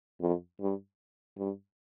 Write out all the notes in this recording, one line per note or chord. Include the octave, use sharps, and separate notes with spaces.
F2
G2
G2